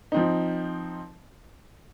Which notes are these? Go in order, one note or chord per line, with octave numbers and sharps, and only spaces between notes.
F3 C4 D#4